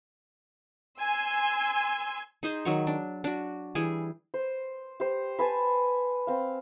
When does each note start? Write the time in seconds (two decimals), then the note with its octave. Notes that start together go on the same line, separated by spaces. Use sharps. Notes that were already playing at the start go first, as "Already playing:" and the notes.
0.99 G#5 C6 E6
2.43 D#4 G#4 C5
2.65 D#3 F#3 C#5
2.87 D4
3.24 D4 F#4
3.75 E3 G3 G#4
4.34 C5
5.00 G4 C5
5.39 B4 G#5 A5
6.27 C4 F5